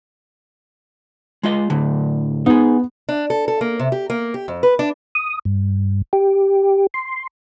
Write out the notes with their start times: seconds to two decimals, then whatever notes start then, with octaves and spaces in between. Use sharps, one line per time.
1.43 G#3 F4 D#5
1.70 A2 D3
2.46 B3 D#4 G#4
3.09 D4
3.30 A4
3.48 A4
3.61 A#3
3.79 C3
3.92 G4
4.10 A#3
4.34 G4
4.48 F2
4.63 B4
4.79 D4
5.15 D#6
5.45 G2
6.13 G4
6.94 C6